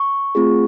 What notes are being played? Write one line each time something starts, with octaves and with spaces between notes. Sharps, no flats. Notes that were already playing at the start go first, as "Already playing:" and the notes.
Already playing: C#6
A3 C4 F4 G#4